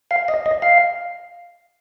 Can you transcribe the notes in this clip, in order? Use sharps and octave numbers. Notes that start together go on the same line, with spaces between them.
F5
D#5
D#5
F5